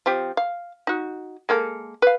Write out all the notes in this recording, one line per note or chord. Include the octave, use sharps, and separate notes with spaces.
F3 C4 G4
F5
D#4 F#4
G#3 A#3 A4
B4 F5